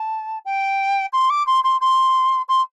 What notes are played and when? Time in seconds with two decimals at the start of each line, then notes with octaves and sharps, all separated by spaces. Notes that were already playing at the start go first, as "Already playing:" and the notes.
Already playing: A5
0.45 G5
1.13 C6
1.30 D6
1.47 C6
1.64 C6
1.81 C6
2.49 C6